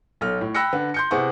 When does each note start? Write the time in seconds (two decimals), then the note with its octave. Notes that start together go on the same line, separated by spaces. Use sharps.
0.21 B1 A4 F6
0.41 A2
0.54 G5 B5 E6 F#6 A#6 C#7
0.73 D3 B4
0.94 C6 G6 C#7
1.11 C3 B3 E4 G#4 F#5 C#6